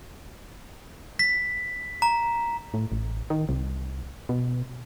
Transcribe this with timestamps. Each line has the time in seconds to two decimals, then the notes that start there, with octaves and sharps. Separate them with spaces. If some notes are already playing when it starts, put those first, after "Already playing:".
1.19 B6
2.02 A#5
2.74 A2
2.92 A1
3.30 D#3
3.49 C2
4.29 B2